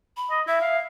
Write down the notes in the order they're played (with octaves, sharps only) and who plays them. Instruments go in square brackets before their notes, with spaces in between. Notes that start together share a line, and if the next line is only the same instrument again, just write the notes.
[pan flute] B5
[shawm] D#5
[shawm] E4 [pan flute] E5
[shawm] F5